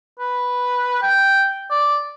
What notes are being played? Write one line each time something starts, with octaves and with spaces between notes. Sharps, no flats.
B4
G5
D5